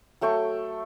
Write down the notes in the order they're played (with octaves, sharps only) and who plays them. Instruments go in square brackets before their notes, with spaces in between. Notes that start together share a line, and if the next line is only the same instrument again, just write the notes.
[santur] F#3 A3 G5 C#6